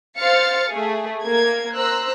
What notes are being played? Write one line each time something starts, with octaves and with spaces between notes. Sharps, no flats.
C5 F5 F6 A6 C#7
A3 G#4
A#3 G#6
C5 A#5 E6 F#6